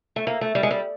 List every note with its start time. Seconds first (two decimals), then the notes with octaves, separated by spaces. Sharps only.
0.16 A3
0.27 A#3
0.41 A3
0.55 G3
0.63 G#3
0.71 G3